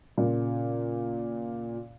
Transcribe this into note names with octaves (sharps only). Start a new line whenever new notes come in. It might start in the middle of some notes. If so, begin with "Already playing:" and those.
A#2 C#3